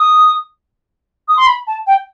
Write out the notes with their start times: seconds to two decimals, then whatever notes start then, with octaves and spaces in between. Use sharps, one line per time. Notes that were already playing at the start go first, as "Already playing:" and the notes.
Already playing: D#6
1.28 D#6
1.37 C6
1.47 B5
1.67 A5
1.87 G5